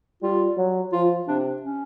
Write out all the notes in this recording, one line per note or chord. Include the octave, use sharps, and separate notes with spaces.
G3 F4
F#3
F3 F4
C3 D4
C#4